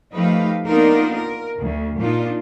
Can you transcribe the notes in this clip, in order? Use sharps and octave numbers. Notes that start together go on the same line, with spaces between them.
F3 A3 D#4 G4 B4 F5
A#3 B3 D4 D#4 F4 A#4
A#4
D2
A#2 D4 D#4 F4